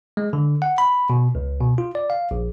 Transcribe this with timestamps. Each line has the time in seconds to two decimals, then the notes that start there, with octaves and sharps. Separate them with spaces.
0.17 G#3
0.33 D3
0.62 F#5
0.78 B5
1.10 B2
1.35 C#2
1.61 B2
1.78 F4
1.95 D5
2.10 F5
2.31 A#1